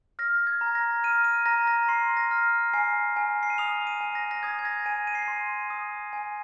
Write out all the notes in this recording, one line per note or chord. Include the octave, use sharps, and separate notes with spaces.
F6 A#6
G#6
A#5
A#6
F6 D#7
D#7
A#5 A#6
A#6
C6 C7
A#6
F6
G#5 C7
G#5
C7
D#7
D#6 F7
D#7
G#5
A#6
A#6
D#6 G#6
G#6
A#6
G#5 D#7
D#7
C7
D#7
C6
D#6
G#5